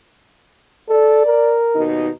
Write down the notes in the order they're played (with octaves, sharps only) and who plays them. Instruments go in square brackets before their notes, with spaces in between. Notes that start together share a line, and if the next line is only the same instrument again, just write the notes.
[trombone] A4 [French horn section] D5
[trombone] A#4
[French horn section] D#2 B2 D#4